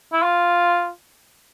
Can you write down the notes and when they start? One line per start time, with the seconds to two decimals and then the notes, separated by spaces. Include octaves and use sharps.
0.12 E4
0.22 F4